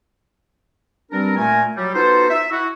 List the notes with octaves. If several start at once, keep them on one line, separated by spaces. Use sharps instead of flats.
G2 G3 C4 D4 A#4
A#2 A3 A#4 G#5
F#3 G3
B3 D#4 F4 F#4 A4 C5
E5
E4 F#4